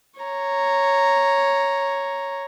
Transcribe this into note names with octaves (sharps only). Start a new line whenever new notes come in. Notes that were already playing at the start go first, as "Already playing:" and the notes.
C#5 A#5